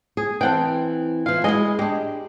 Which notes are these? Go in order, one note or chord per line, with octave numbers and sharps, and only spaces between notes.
G#4
E3 C4 A4 F#5 G5
E3 F4 F5
G#3 E4 F#4 G#4 D#5 G#5
G#3 D4 G4